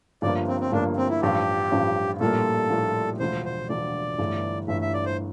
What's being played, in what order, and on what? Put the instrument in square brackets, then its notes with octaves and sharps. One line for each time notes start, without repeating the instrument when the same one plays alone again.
[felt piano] G1 G2 F3 A#3 [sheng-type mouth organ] D5
[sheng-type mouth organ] C4
C4
[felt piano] G1 G2 F3 A#3 [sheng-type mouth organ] D4
[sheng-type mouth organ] C4
E4
[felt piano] A1 G2 F3 [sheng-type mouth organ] G4
[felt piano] A1 G2 F3
[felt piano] A#1 A2 G3 A#3 F4 [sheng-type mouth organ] A4
[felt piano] A#1 A2 G3 A#3 F4
[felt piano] E1 D2 D3 F3 [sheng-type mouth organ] C5
[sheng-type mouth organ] C5
[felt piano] E1 D2 D3 F3 [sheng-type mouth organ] D5
[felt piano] G1 G2 E3 A3
[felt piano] G1 G2 E3 A3 [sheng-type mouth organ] E5
[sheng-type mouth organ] E5
D5
C5